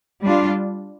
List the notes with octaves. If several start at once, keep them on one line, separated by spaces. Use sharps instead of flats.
G3 D4 F4